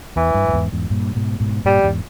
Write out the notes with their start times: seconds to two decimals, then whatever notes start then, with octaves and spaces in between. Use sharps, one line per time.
0.16 E2 E3
0.34 G2
0.48 G2
0.53 E2 G#2
0.72 E2 G#2
0.90 G2 A#2
1.15 G#2 B2
1.40 G#2 B2
1.65 G2 A#2 G3
1.83 E2 G#2